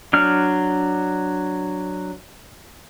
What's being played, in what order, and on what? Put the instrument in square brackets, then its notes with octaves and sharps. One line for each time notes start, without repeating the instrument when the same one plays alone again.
[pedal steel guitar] F#3 D4 F6